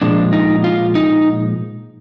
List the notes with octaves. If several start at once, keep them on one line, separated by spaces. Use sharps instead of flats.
A#2 F3 G#3 D4
D#4
F4
D#4